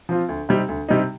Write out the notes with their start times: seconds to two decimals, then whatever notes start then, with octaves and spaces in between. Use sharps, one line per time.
0.09 F3 C4 F4
0.29 D2
0.49 C3 G3 C4 D#4
0.68 D2
0.89 C3 G3 C4 D#4